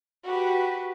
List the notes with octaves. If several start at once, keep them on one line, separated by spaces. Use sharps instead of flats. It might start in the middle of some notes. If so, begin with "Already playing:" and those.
F#4 G4 B4